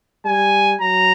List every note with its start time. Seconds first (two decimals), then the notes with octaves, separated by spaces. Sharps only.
0.25 G3 G#5
0.81 F#3 A#5